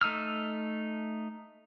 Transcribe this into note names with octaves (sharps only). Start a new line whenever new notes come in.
A3 D#4 E6 F6